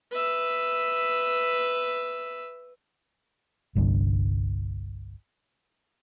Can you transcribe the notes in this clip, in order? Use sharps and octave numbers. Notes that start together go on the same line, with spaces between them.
B4 E5
G1 C2 G2 D3